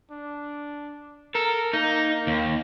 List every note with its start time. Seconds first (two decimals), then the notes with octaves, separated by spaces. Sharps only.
0.11 D4
1.35 A4 A#4
1.73 A#3 D#4
2.27 D#2